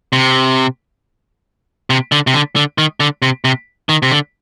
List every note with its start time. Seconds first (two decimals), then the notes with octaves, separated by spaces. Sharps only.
0.13 C3
1.90 C3
2.12 D3
2.27 C3
2.34 D3
2.56 D3
2.78 D#3
3.00 D3
3.22 C3
3.45 C3
3.89 D#3
4.03 C3
4.11 D3